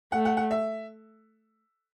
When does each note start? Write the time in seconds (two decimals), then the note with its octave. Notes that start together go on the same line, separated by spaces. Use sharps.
0.12 A3 F#5
0.25 F#5
0.37 F#5
0.51 E5